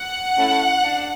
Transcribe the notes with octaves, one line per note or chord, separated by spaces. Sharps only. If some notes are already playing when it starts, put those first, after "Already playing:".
Already playing: F#5
A3 C#4 E4 A4
D4